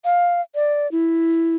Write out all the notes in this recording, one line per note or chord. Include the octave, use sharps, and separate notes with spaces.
F5
D5
E4